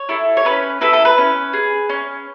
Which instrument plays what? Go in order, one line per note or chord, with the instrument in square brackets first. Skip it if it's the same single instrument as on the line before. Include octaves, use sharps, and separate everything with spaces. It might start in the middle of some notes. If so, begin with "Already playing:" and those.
Already playing: [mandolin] C#5
E4 A4
C#5
C#4 B4
E4 A4 B4
A4
B4
C#4
G#4
C#4